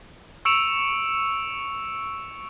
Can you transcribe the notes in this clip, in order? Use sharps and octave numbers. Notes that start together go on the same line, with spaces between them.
C#6 E6 C#7 D7 E7 F7